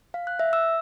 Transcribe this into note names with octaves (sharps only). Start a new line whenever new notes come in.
F5
F#6
E5
E6